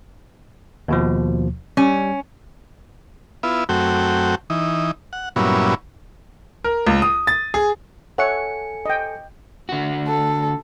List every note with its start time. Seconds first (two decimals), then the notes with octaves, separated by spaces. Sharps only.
0.88 D#2 B2 F3
1.77 G3 C#4
3.43 B3 E4 F4
3.69 F#2 A3 C4 F#4 G5
4.50 E3 D#4
5.13 F#5
5.36 G2 A#2 F#3 B3 C#4 E4
6.64 A#4
6.87 C#2
7.02 D#6
7.27 A6
7.54 G#4
8.18 A4 C#5 E5 F#5 G#5 C#7
8.86 D#5 G5
9.69 D3 F#4
10.07 A4